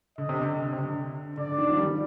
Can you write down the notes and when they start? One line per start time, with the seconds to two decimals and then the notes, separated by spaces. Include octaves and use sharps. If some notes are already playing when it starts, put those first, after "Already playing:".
0.18 D3 D#5
0.29 C3
0.42 D3
0.73 C3
0.79 D3
1.37 D3 D5
1.52 D3
1.58 D#3
1.70 F3
1.77 G3